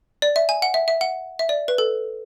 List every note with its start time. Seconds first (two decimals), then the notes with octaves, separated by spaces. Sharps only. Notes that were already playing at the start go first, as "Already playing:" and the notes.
0.22 D5
0.36 E5
0.49 G#5
0.62 F#5
0.74 E5
0.88 E5
1.01 F#5
1.39 E5
1.49 D5
1.68 B4
1.78 A4